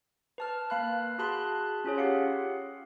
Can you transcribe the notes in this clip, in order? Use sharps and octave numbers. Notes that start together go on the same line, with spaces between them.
B4 A5 F6
A#3 F5 B5 F#6
F#4 G#4 A5 B5 C6 F#6
C#4 F4 G#4 C#5
G4 F5 F#5